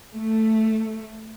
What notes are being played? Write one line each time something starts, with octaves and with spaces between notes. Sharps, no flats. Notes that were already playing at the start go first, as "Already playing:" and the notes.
A3